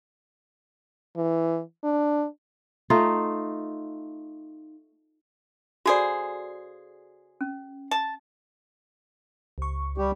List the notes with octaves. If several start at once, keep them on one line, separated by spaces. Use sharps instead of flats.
E3
D4
A3 D#4 F4
C#3 F#4 G#4 A4 C5 D5
C#4
A5
C#2 C#6
G3 G4